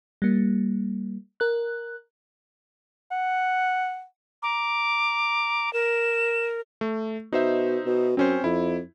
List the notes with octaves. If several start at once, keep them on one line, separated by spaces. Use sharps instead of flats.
G3 A#3
A#4 F#6
F#5
A#5 D6
A#4 E7
A3
B2 D#4 C5 E5
B2
F#2 C4 C#4 C5
F2 E4